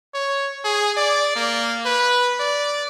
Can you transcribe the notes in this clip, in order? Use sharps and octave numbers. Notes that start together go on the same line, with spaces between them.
C#5
G#4
D5
A#3
B4
D5